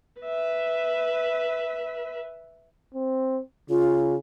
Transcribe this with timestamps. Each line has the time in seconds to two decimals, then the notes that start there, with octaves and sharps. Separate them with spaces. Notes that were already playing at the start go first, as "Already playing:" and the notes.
0.21 B4 E5
2.94 C4
3.70 C#3 F4